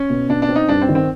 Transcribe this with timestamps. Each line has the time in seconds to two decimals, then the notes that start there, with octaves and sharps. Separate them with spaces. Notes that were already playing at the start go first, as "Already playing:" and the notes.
Already playing: C#4
0.10 B2
0.29 B2 D4
0.42 D4
0.49 C4
0.56 D#4
0.69 G2 D4
0.82 C4
0.89 D#3
0.95 C4